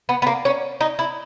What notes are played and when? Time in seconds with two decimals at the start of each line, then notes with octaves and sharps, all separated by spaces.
0.09 B3
0.22 B3
0.27 A#3
0.45 C#4
0.81 D#4
0.99 E4